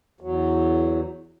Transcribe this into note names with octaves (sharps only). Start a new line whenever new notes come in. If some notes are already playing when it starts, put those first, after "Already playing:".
E2 F#3